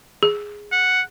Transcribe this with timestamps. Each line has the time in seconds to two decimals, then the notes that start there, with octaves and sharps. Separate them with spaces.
0.23 G#4
0.72 F#5